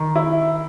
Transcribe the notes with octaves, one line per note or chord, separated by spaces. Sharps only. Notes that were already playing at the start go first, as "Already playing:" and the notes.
Already playing: D#3
E4